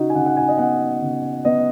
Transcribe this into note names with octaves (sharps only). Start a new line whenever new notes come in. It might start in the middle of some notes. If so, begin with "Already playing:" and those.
Already playing: C#3 D#4 F#4
G#5
C#3 F#5
F#5
G#5
D#5
B3 F#5
C#3
B3 D#5